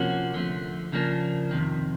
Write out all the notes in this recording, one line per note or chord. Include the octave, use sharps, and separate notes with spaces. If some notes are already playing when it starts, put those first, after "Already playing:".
Already playing: C3 F3 A#3 C#4 F#4
D3 F3 A3
C#3 F3 A#3 D4
F2 C3 D#3